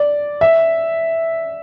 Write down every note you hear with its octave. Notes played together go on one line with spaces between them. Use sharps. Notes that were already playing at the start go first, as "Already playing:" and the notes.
Already playing: D5
E5